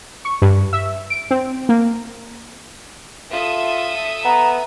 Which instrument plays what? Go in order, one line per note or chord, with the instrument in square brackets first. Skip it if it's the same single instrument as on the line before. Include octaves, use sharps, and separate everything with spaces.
[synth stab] C#6
G2
E5
D7
C4
A#3
[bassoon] F4 [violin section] A4 E5 D#6
[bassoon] B3 [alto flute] A#5